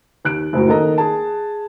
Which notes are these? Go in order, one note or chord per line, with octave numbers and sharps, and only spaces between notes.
D#2 F#6 D7
F#1 A2 F#4
D#3 A#3 A4 D#5 A#5
G#4 A5